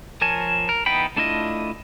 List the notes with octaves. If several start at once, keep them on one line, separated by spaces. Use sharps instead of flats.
F3 A#4 C#5 G#5 A5
A#4
E3 B3 D#4 G5 B5
A3 D4 E4 F4 D#5